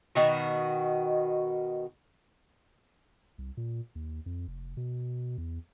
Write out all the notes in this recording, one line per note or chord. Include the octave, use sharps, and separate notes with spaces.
B2 D#3 F#4
C2
A#2
D#2
F2
F1
B2
E2